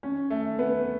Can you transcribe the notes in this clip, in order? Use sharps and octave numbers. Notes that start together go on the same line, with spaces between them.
C#4
A3
B3